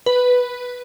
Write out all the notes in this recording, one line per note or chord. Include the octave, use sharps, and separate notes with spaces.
B4